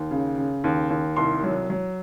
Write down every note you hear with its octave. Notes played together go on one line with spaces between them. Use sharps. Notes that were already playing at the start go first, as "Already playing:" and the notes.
Already playing: D#2
C#3
C#3
D#2
D#2
C2 C6
F#3
F#3